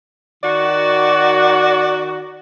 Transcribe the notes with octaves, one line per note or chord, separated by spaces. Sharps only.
D#3 F#4 D5